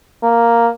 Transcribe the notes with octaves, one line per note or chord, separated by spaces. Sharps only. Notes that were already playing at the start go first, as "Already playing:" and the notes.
A#3